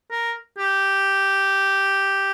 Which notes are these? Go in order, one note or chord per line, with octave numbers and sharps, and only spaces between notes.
A#4
G4